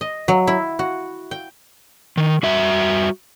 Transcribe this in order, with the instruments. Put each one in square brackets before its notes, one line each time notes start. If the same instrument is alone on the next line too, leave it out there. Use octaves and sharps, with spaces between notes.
[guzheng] D#5
F#3
E4
F#4
G5
[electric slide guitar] D#3
G3 F#4 E5